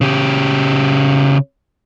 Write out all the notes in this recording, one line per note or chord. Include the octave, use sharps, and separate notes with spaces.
C#3 G4